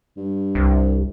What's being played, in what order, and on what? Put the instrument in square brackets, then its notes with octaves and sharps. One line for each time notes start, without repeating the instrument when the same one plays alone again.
[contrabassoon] G2
[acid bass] C2